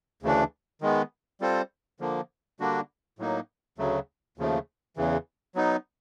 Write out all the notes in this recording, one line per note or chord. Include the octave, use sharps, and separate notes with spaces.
D2 C#3 E3 A3 D4
D#3 G#3 B3
G3 C4 F4 A4 C5
D3 F3 A#3
D3 G3 A#3 D4 F#4
A2 F#3 A#3 D#4
D2 C#3 F#3 A3
D#2 C#3 F3 A3
E2 C#3 E3
F#3 B3 D#4